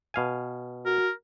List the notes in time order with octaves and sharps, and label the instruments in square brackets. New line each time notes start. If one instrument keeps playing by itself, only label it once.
[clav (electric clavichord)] B2 F5 G#5
[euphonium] F#4 [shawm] A#4